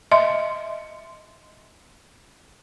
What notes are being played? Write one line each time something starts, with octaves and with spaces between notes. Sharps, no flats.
D#5 E5 C6